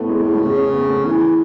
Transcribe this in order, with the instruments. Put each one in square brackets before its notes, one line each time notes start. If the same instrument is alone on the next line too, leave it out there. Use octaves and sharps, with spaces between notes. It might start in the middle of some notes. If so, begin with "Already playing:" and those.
Already playing: [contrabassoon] A2 [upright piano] A3 B3
[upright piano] G#3
G#3
A3
[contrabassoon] C#3
[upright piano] C#4
B3
B3
A3
[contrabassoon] E3 [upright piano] G#4